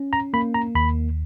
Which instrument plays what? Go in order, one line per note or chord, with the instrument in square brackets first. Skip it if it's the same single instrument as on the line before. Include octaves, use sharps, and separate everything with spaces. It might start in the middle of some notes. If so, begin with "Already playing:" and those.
Already playing: [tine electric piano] C#4
A#5
A#3 B5
A#5
D#2 B5